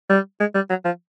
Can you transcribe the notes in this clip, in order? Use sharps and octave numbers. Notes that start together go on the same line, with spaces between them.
G3
G#3
G3
F#3
F3